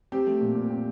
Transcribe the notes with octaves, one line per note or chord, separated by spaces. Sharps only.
C4 G4
A3
A#2
A#2
C4